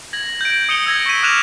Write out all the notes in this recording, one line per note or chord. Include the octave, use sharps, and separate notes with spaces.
G#6 A#6 F#7
G6 D7
D#6 C#7 D#7 F7 G7
E6 G#6 A#6
C#6 G#6 B6 D#7
D6 F6 F#6 E7 F7